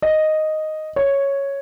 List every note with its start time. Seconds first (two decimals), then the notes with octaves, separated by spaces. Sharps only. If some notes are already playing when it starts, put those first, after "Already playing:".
0.02 D#5
0.96 C#5